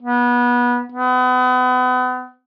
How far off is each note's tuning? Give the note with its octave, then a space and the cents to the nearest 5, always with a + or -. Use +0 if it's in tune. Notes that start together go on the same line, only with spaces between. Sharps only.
B3 -25
B3 +35